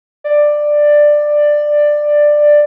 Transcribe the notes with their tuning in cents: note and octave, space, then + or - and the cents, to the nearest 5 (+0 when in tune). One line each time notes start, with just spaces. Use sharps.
D5 +10